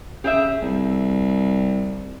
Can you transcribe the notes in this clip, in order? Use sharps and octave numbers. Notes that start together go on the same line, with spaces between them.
C#3 G4 G#4 E5
C2